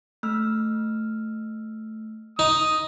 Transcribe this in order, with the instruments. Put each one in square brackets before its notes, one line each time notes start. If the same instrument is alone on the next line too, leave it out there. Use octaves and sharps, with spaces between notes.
[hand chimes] A3 E6 F6
[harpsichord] D#4 [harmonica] D#6